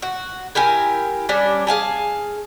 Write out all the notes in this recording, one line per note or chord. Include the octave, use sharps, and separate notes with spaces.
F#4
E4 G4 A#4 G#5
G3 C#4 D4
G#4 F5 G#5 A5